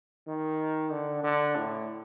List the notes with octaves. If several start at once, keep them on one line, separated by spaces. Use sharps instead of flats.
D#3
D3
D3
A2